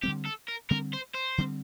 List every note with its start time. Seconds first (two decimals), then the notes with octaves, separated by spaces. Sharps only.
0.03 D3 G3 C4 G4
0.26 A4
0.49 A#4
0.70 D3 G3 C4 A#4
0.94 C5
1.15 C5
1.38 D3 G3 C4